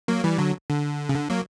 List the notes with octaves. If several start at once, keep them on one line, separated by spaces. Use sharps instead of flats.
F#3 A#3
E3 G3
D3 F#3
D3
C#3
D3
F#3 A#3